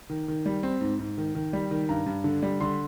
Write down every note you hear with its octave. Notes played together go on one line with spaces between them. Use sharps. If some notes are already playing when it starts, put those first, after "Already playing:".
D#3
D#3
G3
C4
G#2
G#2
D#3
D#3
G3
D#3
G2 A#5
G2
D3
G3
D3 C6